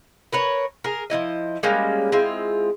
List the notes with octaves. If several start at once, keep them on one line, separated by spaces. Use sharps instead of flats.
A#4 B4 C#5
G#4 A#4
F3 B3 E4 D#5
G3 G#3 A#3 C#4
G#3 C4 E4 F4